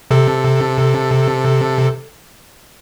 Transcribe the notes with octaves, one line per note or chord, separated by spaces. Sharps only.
C3 A4